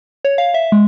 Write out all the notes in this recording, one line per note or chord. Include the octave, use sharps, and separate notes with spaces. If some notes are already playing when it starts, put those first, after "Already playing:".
C#5
F5
E5
G#3